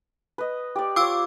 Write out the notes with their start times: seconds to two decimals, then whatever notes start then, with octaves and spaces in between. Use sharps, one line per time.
0.38 B4 D#5
0.76 G4 D5
0.96 F4 C#5 D6 E6